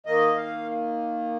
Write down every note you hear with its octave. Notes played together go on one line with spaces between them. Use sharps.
D#3 A#3 D#5
F5